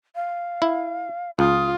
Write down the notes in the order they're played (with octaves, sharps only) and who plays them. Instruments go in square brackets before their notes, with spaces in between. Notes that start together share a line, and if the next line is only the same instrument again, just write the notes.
[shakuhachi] F5
[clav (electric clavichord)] E4
[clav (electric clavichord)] C#2 [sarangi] F4 [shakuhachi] D#6